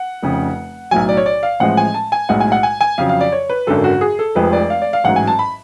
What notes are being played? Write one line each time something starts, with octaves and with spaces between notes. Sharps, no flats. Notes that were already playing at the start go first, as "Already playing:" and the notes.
Already playing: F#5
F1 F2 C#3
B1 A2 F#3 G#5
D5
C#5
D5
F5
A1 A2 F3 G#3 F#5
G#5
A5
G#5
B1 A2 G#3 F#5
G#5
F#5
G#5
G#5
F2 C#3 F#3 F5
F5
D5
C#5
B4
G#1 F#2 D3 F#3 A4
F#4
G#4
A4
F1 F2 F3 G#3 B4
D5
F5
D5
F5
A1 G#2 F#3 F#5
G#5
A5
B5